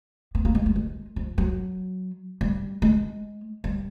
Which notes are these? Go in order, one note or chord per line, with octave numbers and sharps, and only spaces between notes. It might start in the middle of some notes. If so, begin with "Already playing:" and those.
B3
A#3
G#3
G3
G#3
F3
F#3
G3
G#3
G3